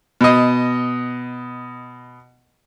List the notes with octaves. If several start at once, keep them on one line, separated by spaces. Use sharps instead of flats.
B2 D#5